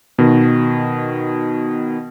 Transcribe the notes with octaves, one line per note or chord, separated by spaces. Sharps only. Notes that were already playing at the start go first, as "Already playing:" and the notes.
B2 D#3